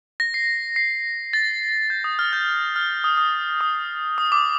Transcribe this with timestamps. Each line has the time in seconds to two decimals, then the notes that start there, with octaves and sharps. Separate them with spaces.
0.20 A#6
0.34 C7
0.76 C7
1.33 A6
1.90 G6
2.04 D#6
2.19 F6
2.33 G6
2.76 F6
3.04 D#6
3.18 D#6
3.61 D#6
4.18 D#6
4.32 D6